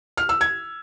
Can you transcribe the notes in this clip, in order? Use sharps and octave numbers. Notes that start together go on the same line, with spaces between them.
F6
E6
G#6